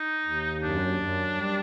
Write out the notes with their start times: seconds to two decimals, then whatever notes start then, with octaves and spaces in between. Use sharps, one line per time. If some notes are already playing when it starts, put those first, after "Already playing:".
Already playing: D#4
0.25 D#2
0.63 F#2 D4
1.00 F#2
1.36 G3